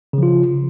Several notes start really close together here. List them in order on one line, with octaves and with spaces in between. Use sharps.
C#3 F3 F4